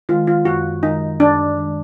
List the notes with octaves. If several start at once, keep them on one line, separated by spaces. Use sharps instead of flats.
D#3 G#3 F4
F4
F#2 F#4
D#3 G#3 D#4
F#2 D4
D#3 G#3